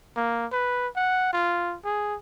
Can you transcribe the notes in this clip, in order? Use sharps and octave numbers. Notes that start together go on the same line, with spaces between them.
A#3
B4
F#5
F4
G#4